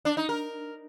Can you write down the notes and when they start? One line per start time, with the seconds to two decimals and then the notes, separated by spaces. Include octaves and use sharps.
0.05 D4
0.17 D#4
0.29 A#4